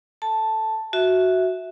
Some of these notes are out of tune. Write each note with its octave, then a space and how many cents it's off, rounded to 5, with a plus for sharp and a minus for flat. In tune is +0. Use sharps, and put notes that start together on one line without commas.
A4 +0 A5 +0
F#4 +0 E5 -10